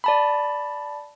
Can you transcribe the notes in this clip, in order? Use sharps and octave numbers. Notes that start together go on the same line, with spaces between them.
D5 A5 B5